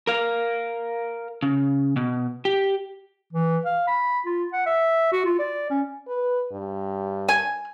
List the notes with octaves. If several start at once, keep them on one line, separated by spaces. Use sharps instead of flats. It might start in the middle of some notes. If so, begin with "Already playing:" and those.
A#4 F5
C#3
B2
G4
E3
F5
B5
F4
F#5
E5
F#4
F4
D5
C#4
B4
G2
G#5